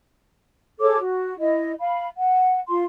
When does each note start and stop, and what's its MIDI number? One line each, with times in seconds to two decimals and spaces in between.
0.81 0.98 68
0.81 0.98 69
0.81 0.98 73
0.81 0.98 86
0.99 1.36 66
1.39 1.72 64
1.39 1.72 75
1.80 2.07 77
1.80 2.07 83
2.19 2.59 78
2.69 2.83 65
2.69 2.83 84